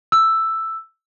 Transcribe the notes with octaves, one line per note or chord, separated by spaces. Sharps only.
E6